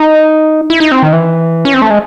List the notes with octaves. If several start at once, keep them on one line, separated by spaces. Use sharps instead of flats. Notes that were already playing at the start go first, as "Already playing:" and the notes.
Already playing: D#4
E4
D#4
C4
D#3
E3
C#4
C4
A3
G#3